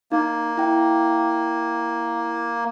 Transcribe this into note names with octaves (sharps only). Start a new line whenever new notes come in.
A#3 D#4
E4 G5